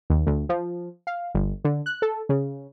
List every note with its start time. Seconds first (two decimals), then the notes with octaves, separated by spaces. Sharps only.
0.10 D#2
0.27 D2
0.49 F3
1.07 F5
1.35 G1
1.64 D3
1.86 F#6
2.02 A4
2.29 C#3